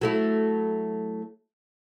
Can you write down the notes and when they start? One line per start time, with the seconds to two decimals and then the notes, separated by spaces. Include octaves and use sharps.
0.01 F#3 A3 E4